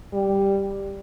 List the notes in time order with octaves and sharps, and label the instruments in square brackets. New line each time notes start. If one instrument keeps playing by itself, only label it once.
[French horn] G3